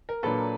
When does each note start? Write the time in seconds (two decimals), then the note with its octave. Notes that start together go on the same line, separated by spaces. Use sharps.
0.09 A#4
0.23 A#2 F#3 A#3 D4 A4 B4